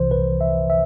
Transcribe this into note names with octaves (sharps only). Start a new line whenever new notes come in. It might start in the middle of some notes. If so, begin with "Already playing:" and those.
Already playing: C2 C3 E3 C5
B4
E5
E5